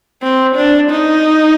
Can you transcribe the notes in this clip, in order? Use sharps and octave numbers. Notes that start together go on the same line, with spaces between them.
C4
D4
D#4